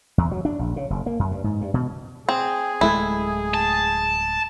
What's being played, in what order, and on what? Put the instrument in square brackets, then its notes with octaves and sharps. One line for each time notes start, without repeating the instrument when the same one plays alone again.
[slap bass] E2
F#3
D4
A#1
C#3
F#1
A#3
F#2
G2
G#2
G2
B2
[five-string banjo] C4 [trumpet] G#4
[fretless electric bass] D1 G#3 A3 [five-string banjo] E4
[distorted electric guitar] A5